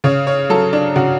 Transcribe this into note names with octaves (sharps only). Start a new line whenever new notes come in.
C#3 C#5
C#5
F#3 A4
D4
C#3 F#4